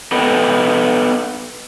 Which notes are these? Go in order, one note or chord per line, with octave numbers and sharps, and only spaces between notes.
B3 A4 B4 D#5 G5